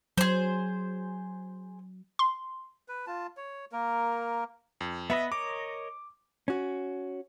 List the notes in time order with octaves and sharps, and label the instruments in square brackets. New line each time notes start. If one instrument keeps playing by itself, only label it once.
[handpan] F#3 [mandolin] G#4 C5
[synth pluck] C6
[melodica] B4
F4 A5
C#5
A#3 A#4
[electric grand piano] F2
[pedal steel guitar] B3 B4 D#5 [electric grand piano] E5
[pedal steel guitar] A#4 C#5 D#5 [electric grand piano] D6
[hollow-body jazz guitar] C#4 F#4